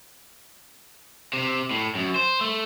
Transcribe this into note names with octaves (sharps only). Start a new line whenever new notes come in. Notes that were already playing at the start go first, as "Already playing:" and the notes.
C3
A2
F#2
C5
A3